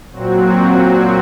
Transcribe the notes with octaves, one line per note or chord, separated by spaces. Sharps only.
A#2 F#3 C4 F#4